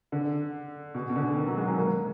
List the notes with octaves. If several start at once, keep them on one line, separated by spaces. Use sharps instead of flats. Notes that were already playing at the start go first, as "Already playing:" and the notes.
D3
B2
B2
D3
D#3
F#3
G#3
F#3
A#3